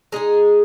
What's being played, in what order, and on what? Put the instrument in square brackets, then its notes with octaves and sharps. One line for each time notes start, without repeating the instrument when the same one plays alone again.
[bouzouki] G#3 D#4 G#4